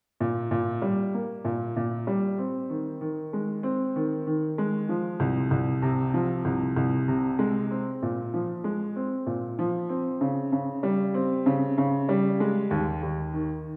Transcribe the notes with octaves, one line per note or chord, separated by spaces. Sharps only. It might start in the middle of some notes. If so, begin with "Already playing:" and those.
A#2
A#2
G3
A#3
A#2
A#2
G3
C4
D#3
D#3
G#3
C4
D#3
D#3
G#3
F3
C2
C2
C3
F3
C2
C2
C3
G#3
C4
A#2
F3
G#3
C4
A#2
F3
C4
C#3
C#3
G3
C4
C#3
C#3
G3
G#3
D#2
D#2
D#3